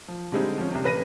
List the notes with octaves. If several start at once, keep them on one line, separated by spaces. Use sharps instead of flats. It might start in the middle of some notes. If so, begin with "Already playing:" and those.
F3
D3 G3 G#3 C4 D#4
F3 C#4
C2 C3
A1 B4 A#6 D#7